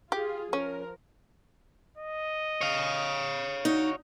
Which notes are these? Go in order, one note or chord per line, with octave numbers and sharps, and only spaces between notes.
F4 G4 G#4
F3 C#4 A#4
D#5
C#5 F5
D#4 F#4